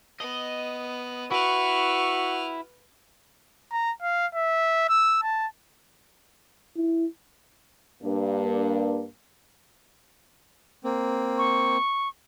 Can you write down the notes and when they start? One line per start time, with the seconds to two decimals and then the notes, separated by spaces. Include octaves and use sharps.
0.20 B3 D#5
1.31 E4 F#4 B4 C#6 F6
3.72 A#5
4.02 F5
4.35 E5
4.89 E6
5.22 A5
6.76 E4
8.03 G2 A#3 D4
10.84 A#3 C4
11.38 C#6